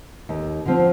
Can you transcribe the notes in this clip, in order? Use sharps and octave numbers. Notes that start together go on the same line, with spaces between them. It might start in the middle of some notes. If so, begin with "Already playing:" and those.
D#2
D3 F3 C4